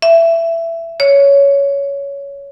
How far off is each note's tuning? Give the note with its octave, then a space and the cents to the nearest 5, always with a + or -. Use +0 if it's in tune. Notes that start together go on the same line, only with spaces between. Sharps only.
E5 +15
C#5 +15